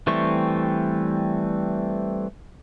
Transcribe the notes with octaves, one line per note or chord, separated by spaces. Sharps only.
E3 G3 A3 C4 C#6